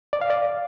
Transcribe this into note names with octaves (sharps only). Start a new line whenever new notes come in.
D5
F5
D5